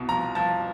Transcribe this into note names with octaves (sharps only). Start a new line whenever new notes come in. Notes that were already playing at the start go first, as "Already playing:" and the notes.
Already playing: C2 B2
F3 A#5
F3 A5